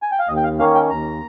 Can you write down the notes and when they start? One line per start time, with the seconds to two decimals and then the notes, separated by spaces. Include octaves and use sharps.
0.03 G#5
0.11 G5
0.19 F5
0.28 D#2 D#5
0.37 G5
0.44 F5
0.59 D#3 A#3 C#4 F5
0.75 G5
0.90 D#2 A#5